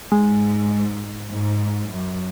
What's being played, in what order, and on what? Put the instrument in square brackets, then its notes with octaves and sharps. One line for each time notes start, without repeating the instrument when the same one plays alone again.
[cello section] G#2 [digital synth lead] G#3
[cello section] G#2
F#2